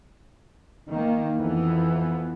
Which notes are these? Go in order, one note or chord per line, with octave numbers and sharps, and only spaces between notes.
D#3 A#3
F2 E3 B3